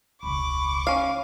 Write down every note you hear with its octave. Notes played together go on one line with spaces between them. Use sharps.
E1 C#2 B5 C#6 D6
C#4 F5